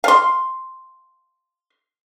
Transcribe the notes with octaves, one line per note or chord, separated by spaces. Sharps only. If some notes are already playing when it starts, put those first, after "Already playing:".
F5 C6